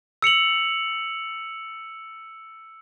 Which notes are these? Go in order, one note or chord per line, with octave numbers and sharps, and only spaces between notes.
E6 C#7 F7 F#7